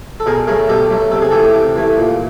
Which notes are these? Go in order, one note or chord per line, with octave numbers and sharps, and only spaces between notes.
A4
B2 G#4 A#4
F#3 A3 G#4 A#4
B2 G4 A4
F#3 A3
C3 A4
G#4
E3 A3 G4 A4
C3
E3 A3
A#2